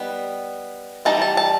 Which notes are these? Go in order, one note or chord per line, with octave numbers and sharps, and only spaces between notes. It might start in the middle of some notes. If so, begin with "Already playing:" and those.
Already playing: G3 B3 D#4
E3 G3 D#4 A5
A5
A5